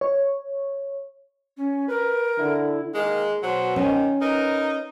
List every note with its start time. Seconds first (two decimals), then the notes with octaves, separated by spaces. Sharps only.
0.01 C#5
1.57 C#4
1.88 A#4 B4
2.39 D3 E4
2.94 D#3 G#3 A#3
3.43 B2 F#3 C5
3.76 D#3 C#4
4.21 D#4 A#4 B4